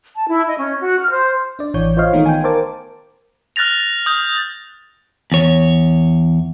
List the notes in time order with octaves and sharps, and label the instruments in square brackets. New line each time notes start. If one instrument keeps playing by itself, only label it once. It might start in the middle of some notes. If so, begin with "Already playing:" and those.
[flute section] A5
E4
D#5
C#4
F#4
F6
C5
[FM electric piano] D4 D5
A1 E3 C#5 G6
F4 C5 C#5 D#5 F5
D#3 E3 A3 B3 D#4
G5 G#5
A#4 C5 A5 D6
[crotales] F6 F#6 A6 A#6 F7
D#6 G6
[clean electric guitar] E2 C#5